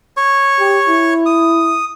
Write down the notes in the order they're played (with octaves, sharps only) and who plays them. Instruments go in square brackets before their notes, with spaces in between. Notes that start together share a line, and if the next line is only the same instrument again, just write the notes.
[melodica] C#5 C#6
[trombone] G4
E4
[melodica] D#6